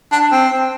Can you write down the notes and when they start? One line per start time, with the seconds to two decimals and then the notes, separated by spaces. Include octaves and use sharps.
0.12 D4
0.32 C4